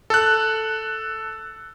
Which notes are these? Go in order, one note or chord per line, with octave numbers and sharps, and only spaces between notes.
A4 F#6